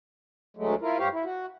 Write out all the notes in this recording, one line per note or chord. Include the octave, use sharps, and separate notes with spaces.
D2 F#3 G#3 A3
E4 F4 A#4
G2 G4 C5 C#5 F5
E4
F#4